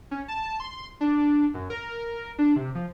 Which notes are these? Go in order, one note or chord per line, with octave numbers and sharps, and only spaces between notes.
C#4
A5
C6
D4
F#2
A#4
D4
C3
F3